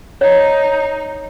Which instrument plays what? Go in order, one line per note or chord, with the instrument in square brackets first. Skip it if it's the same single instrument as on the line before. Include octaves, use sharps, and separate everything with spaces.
[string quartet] D#4 [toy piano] C#5